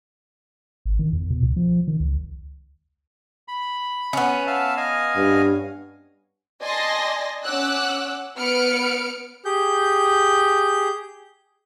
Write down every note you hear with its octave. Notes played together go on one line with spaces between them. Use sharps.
G#1
D#3
E2
B2
C#2
F3
D#3
C#2
B5
B3 C#4
E5 F5 A5
D#5 F5 G#5
G2
D5 D#5 G#5 A5 C6 A#6
C#4 F#5 D6 E6 F#6
B3 B4 F6 C#7 D7
G4 G#4 G6